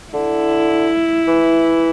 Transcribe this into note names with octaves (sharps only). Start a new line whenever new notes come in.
D3 E4
E3